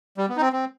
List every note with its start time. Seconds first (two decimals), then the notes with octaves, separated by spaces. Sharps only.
0.18 G3
0.29 B3
0.37 D#4
0.41 C4
0.53 C4